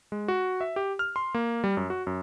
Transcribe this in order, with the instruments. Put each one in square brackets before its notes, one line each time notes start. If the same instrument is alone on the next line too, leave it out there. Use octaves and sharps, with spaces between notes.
[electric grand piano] G#3
F#4
E5
G4
F6
C6
A#3
G3
F#2
F#4
F#2